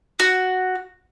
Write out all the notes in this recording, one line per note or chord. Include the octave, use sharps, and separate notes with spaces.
F#4